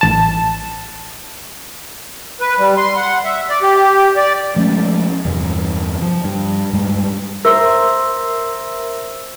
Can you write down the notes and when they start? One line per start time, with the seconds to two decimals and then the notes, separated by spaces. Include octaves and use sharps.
0.01 A1 A5
2.41 B4
2.58 G3
2.77 C6
2.97 F#5
3.24 E5
3.50 D5
3.62 G4
4.17 D5
4.56 F3 G#3 A3 C#4
5.25 E2 G2 C3
6.02 F3
6.24 G2
6.73 G2 G3 G#3
7.45 A#4 C5 E5 E6